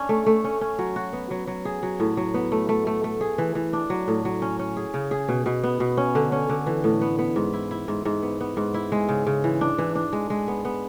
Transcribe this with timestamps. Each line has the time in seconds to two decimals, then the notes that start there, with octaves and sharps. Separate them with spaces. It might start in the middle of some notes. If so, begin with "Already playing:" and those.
Already playing: C#4 D4
0.09 A3
0.26 A3
0.44 C#4
0.61 C#4
0.79 F#3
0.96 F#4
1.13 B3
1.31 F#3
1.47 F#3
1.65 G#4
1.83 F#3
2.00 A2
2.17 F#3
2.34 B3
2.52 A3
2.69 A3
2.87 A3
3.04 A3
3.21 G#4
3.38 E3
3.55 E3
3.73 D4
3.90 F#3
4.08 A2
4.25 F#3
4.42 C#4
4.59 C#4
4.77 G#4
4.94 C#3
5.11 G#4
5.29 B2
5.46 B2
5.64 B3
5.80 B2
5.97 C#4
6.15 D3
6.32 C#4
6.50 D3
6.67 E3
6.84 A2
7.01 B3
7.19 B3
7.36 G#2
7.53 E4
7.71 E4
7.88 G#2
8.05 G#2
8.23 B3
8.40 B3
8.57 G#2
8.74 E4
8.92 G#3
9.09 C#3
9.27 C#3
9.44 E3
9.61 D4
9.78 E3
9.95 D4
10.13 G#3
10.30 G#3
10.48 B3
10.65 B3